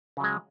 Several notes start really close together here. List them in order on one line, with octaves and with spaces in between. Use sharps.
C#3 F#3 G#3